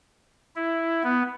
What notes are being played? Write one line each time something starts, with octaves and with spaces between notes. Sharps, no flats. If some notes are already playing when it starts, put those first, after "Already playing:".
E4
B3